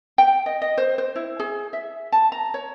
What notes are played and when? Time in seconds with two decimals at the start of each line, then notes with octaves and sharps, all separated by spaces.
0.18 G5
0.46 D#5
0.62 D#5
0.78 C5
0.98 C5
1.16 E4
1.40 G#4
1.73 E5
2.12 A5
2.32 A#5
2.54 C#5